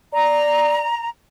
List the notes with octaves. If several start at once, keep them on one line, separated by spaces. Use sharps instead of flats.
D5 A#5